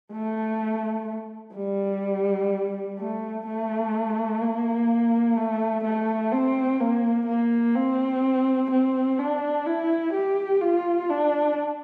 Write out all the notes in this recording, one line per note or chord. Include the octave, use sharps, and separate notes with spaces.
A3
G3
A3
A3
A#3
A3
A3
C4
A#3
A#3
C4
C4
D4
E4
G4
F4
D4